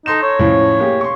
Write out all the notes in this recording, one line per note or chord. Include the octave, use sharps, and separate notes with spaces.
D#4 A4 C6 E7
C#5
A2 F3 C#4
A#3 G4 G#4
C6 C#6